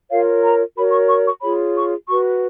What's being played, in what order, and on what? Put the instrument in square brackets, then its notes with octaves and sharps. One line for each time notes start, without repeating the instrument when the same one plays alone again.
[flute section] F4 A#4 C#5 F5
A#5
F#4 A#4 C#5 B5
C#6
C#6
C#6
F4 G#4 C#5 B5
C#6
F#4 B4 C#6